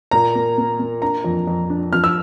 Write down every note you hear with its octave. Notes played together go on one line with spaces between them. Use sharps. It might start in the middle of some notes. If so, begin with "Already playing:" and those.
A#2 A#5
A#3
A#3
A#3
D4 A#5
F2
F2
D4
F3 F6
E6